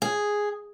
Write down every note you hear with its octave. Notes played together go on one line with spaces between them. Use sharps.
G#4